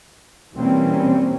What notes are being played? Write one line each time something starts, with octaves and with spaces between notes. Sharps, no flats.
B2 E3 G3 A#3 C4 C#4